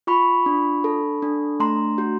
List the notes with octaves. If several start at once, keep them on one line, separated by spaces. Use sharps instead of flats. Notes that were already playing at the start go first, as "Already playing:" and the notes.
F4 B5 C#6
D4
A4
D4
A3 A#5 C6
F#4